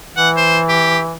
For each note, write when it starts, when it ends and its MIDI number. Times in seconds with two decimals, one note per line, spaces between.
0.16 1.15 52
0.16 0.29 78
0.37 0.59 72
0.68 0.98 67